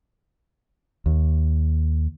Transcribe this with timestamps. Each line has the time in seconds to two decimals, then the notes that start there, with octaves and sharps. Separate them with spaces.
1.06 D#2